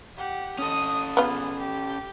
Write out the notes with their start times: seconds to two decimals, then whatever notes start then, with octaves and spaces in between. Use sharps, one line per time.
0.17 G4 F#5
0.59 C#4 A4 D#5 D#6
1.17 B3 F4 G#4
1.59 G4